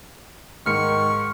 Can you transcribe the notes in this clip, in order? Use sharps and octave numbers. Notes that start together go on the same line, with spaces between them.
G#2 D#3 C#6 F6 C#7